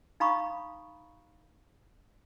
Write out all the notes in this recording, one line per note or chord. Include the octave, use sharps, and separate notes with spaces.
D#4 F5 A#5 B5 C#6 D#6